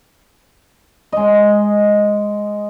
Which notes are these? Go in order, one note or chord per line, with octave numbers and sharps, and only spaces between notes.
G#3 D#5